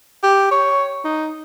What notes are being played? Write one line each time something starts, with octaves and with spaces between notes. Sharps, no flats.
G4
C#5
D#4